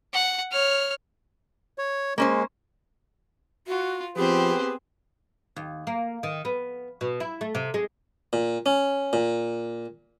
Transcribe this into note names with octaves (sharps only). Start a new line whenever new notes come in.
F#5
C#5 F6
C#5
G#3 A#3 C#4 C5
F4 F#4
F3 B3 C4 G4 G#4 B4 C5
D#2
A#3
D#3
B3
B2
E4
A3
C3
G#3
A#2
C#4
A#2